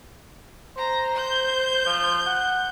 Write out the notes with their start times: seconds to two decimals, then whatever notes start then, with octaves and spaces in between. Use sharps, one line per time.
0.77 C5 A#5
1.16 G6
1.86 F3
2.26 F#5